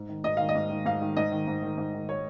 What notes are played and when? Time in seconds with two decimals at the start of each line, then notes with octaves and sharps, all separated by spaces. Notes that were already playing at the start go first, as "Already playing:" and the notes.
Already playing: G#2
0.09 D#3
0.24 G#2 D#5
0.37 D#3 F5
0.49 D#5
0.55 G#2
0.70 D#3
0.86 G#2 F5
1.01 D#3
1.17 G#2 D#5
1.32 D#3
1.47 G#2
1.62 D#3
1.78 G#2
1.94 D#3
2.09 C#5